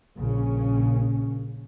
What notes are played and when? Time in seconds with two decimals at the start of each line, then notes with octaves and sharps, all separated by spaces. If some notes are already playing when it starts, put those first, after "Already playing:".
0.19 A#1 C#3 C#4